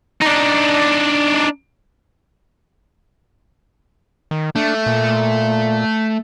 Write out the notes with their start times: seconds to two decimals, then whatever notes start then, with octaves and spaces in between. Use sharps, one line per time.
0.21 D4 D#4
4.31 D#3
4.56 A3 D4
4.86 A#2